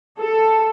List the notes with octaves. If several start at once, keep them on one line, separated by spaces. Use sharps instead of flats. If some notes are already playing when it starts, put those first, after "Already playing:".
A4